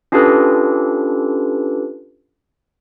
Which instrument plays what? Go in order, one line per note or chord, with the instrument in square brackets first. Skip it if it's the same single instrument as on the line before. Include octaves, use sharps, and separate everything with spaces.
[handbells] C#4 D4 F4 G4 A4 B4